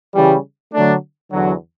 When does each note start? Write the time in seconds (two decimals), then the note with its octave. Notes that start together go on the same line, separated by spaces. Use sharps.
0.13 C#3 E3 G3
0.73 D3 F#3 A3 D4
1.31 E2 D3 F#3